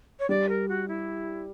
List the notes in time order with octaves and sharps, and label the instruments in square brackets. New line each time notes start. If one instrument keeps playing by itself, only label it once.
[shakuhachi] C#5
[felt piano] G3 [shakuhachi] D5
[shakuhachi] A#4
F#4
E4